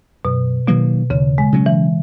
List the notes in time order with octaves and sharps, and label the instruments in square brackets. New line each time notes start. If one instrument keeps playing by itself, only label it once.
[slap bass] F#2 [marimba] B2
[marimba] B2 [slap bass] D#3 F#3 A#3
[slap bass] D#2 [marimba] C#3
[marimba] G#3
[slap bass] C#3 F#3 C#4
[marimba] E3